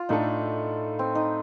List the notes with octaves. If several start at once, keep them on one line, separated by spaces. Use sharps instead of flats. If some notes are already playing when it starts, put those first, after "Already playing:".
Already playing: F4
A2 A3 D4 D#4 A4
C4
D#4